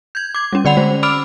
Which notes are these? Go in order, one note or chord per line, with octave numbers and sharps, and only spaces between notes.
G6 G#6
D6 G#6
G3 C#4
D3 D5 F#5 B5 F7
G#3 C5
B5 D6 E6 F6 D7 F7